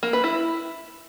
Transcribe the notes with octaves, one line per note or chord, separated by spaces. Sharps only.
A#3
B4
E4